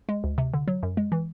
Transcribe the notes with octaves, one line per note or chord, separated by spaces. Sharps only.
G#3
D2
C3
D3
F#3
F#2
G#3
E3